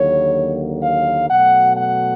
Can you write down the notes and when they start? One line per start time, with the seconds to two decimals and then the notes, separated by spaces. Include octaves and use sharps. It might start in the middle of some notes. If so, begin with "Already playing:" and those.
Already playing: D#2 D3 F#3 A#3 C#5
0.83 F5
1.30 B2 F#3 A3 F#5
1.77 F#5